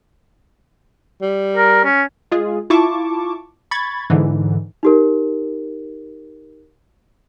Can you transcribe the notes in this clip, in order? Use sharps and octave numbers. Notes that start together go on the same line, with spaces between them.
G3
A#4
C#4
G#3 F4 G#4
E4 F4 A5 C#6 D6
B5 C#6 G#6 A6
G#2 D3 E3
D#4 G4 A#4